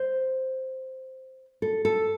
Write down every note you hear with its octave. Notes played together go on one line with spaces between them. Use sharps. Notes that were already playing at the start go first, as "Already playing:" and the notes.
Already playing: C5
A4
A4